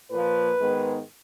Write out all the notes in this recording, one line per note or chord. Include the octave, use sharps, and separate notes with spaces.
A#2 F3 A#3 B4
G#2 D#3 G#3 B3